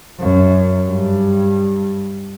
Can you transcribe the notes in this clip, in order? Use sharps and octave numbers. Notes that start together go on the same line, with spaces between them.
F#2
G2